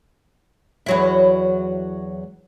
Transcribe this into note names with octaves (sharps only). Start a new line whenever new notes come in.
E2 F#3 E4